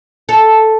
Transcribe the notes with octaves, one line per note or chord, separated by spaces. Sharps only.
A4